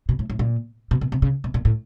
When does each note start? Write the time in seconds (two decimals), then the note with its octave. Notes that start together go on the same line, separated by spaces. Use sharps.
0.09 B2
0.19 A2
0.30 A2
0.39 A#2
0.91 B2
1.01 B2
1.12 C3
1.22 C#3
1.44 B2
1.54 A#2
1.65 A2